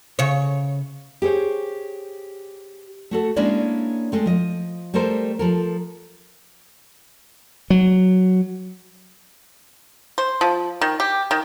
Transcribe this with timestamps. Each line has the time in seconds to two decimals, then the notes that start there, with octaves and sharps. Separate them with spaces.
0.19 C#3 C#5
1.22 G4 G#4 C5 C#5
3.11 A3 F#4 A4
3.36 G#3 A#3 C#4 D4 E4 D5
4.12 G#3 A3 C4
4.26 F3 D#5
4.94 G3 A3 A4 A#4 C5
5.39 F3 A4 A#4
7.70 F#3
10.18 C5
10.41 F3
10.81 D#3
11.00 G4
11.31 D#3